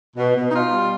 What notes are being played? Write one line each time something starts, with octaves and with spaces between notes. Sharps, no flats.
B2
B2
D#4
B2 F4
G3